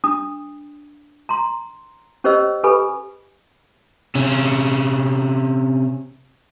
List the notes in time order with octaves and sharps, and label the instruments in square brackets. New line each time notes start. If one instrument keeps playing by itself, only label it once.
[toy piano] D4 D#6
A#5 C6
C#4 G4 C5 C#5 D#5 E6
G4 A4 B4 G#5 B5
[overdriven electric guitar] C3 C#4